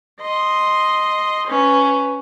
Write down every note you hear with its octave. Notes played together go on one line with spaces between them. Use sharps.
D#5 C6
C#4 B4